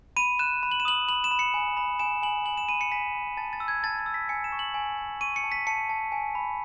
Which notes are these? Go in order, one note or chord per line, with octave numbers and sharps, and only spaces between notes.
B5 D#7
F#6 E7
B5
F#7
E7
D#6 F#7
B5 F#7
E7
B5
C#7
G#5
B5
G#5 E7
G#5 F#7
G#5 F#7
E7
B5 D#7
C#7
G#5 B6
B5
A5 A6
A6
E6
G#6
A5 A6
A6
E6
B6
G#5 C#7
E7
C#6
F#7
G#5
G#5
C#6 D#7
C#7
A5
B6
A5 C#7
A5
G#5
B5